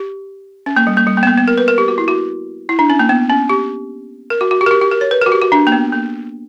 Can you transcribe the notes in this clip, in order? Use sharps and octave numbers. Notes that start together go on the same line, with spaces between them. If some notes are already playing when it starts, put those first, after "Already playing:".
Already playing: G4
C#4
A#3
G3
A#3
G3
A#3
B3
A#3
B3
A#4
B4
A#4
G4
F#4
E4
F#4
E4
D4
C#4
A#3
B3
C#4
G4
A#4
F#4
F#4
G4
A#4
G4
G4
A#4
C#5
B4
F#4 A#4
G4
F#4
D4
A#3
B3
A#3